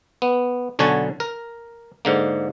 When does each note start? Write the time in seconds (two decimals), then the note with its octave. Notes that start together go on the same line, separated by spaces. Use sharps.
0.22 B3
0.79 B1 D3 F#4 C#5 G#5 A5
1.20 A#4
2.05 G#2 D3 A#3